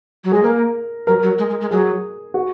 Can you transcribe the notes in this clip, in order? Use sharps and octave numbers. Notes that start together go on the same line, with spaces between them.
F#3
G#3 G#4
A#3 A#4
F#3 A#4
F#3
G#3
G#3
G#3
F#3 G#4
F#4